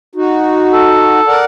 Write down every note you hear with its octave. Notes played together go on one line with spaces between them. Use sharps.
D#4 F#4
A4
A#4 D5 F#5